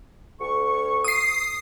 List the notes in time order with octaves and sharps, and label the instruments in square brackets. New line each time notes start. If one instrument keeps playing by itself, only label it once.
[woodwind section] D2 C#6
[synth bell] D#6 C7